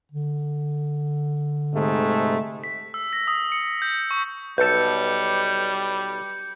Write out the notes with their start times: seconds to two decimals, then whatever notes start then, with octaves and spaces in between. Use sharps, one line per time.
0.12 D3
1.73 G#2 C3 A3
2.64 B6
2.94 E6
3.13 A#6
3.28 D#6
3.52 C#7
3.82 G6
4.11 C#6
4.58 B1 G3 A4 B4 G6 C#7